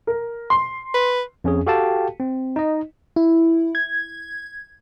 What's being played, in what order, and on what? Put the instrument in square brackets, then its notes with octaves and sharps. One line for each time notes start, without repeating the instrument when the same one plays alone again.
[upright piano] A#4
C6
[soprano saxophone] B4
[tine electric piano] F2 C#4 G#4
F#4 G4 A4 F5 G5 A5
C4
D#4 D#5
[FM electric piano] E4
G#6